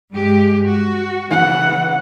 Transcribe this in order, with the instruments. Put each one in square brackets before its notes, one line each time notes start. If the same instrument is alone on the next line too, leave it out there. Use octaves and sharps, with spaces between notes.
[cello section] G2 G#3 G4
F#4
[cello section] C#3 E3 [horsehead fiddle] F#5